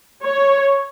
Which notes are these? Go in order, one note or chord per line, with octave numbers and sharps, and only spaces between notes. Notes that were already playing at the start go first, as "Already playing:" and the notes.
C#5